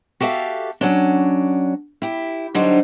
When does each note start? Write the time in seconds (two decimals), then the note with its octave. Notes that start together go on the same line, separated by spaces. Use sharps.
0.20 F#4 G4 A4 E5 F5
0.81 F#3 C#4 D4
2.02 E4 G4
2.54 D3 F#3 G3 D4 D#4 C5